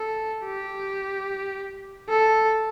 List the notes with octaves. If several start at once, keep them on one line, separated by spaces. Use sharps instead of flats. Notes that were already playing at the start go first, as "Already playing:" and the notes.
Already playing: A4
G4
A4